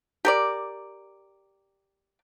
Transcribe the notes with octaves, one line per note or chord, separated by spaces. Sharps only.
G4 A#4 D5